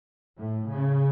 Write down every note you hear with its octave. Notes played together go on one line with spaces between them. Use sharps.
A2
C#3